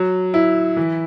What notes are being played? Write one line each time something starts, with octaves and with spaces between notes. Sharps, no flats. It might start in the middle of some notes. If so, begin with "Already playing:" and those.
Already playing: F#3
E4
E3